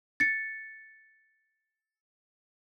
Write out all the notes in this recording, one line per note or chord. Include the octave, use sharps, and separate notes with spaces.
A6 C#7